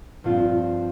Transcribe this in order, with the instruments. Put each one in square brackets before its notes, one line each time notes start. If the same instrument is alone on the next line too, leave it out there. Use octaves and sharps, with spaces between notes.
[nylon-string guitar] G2 F3 C4 F4